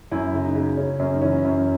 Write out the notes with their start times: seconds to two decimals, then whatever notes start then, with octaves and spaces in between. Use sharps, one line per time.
0.11 F#2 E4
0.33 C#3
0.44 D#4
0.55 C#3
0.77 C#3 C#4
0.99 F#2 C#4
1.14 D#4
1.22 E3 C#4
1.45 F#2